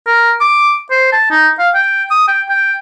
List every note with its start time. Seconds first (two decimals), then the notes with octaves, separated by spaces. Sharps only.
0.07 A#4
0.41 D6
0.91 C5
1.12 A5
1.31 D#4
1.59 F5
1.75 G5
2.11 D#6
2.28 G5
2.49 G5